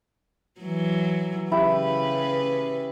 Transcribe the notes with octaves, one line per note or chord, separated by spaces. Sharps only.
E3 F#3
C#3 E4 G4 B4